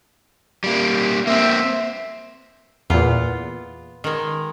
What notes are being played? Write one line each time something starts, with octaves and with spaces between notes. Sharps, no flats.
G3 A#3
A#3 C4 C5 E5
E2 A#2 B3 F4
D#3 G#3